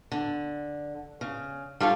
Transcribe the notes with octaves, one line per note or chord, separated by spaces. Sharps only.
D3
C#3
G3 F4 A4 C#5 F5